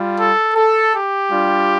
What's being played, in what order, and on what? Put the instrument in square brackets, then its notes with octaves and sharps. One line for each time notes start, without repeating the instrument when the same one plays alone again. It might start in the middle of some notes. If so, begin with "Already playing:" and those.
Already playing: [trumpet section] G3 F4
A4
A4
G4
G3 D4 F4